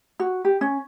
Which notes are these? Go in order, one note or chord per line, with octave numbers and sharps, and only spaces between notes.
F#4
G4
C#4